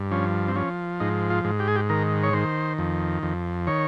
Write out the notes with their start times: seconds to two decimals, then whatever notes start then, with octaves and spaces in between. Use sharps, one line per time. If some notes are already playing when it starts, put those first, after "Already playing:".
Already playing: G2
0.11 F3 C#4
0.48 C4
0.55 F3 C#4
1.00 G#2 D#4
1.30 F4
1.45 G#2
1.60 G4
1.68 G#4
1.76 G4
1.89 D#3 A#4
2.23 C#5
2.33 D#3 C5
2.78 F2
3.23 F2
3.67 D#3 C#5